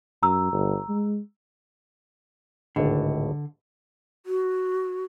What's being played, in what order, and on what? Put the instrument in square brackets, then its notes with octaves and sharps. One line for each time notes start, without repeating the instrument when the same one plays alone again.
[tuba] F#2 [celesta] A#5 E6
[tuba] G1
G#3
[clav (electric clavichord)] G#1 C#2 A2 [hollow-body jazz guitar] D3
[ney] F#4